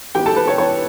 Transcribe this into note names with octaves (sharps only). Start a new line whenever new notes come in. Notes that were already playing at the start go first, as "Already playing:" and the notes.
E3 B3 G4 G5
A4 A5
B4
C#5
E3 B3 C#5